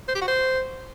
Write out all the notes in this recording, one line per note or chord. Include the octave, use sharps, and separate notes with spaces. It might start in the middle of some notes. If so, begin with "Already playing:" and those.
C5
G4
F#4
C5